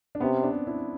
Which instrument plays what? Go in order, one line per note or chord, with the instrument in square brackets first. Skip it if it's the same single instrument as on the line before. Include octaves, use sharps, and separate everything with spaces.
[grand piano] D4
[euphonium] C3 [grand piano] B3 C#4
[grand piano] C4 D4
D4 E4